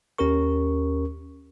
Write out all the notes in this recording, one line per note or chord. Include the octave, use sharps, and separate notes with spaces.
D#2 C#4 G4 A#4 C#6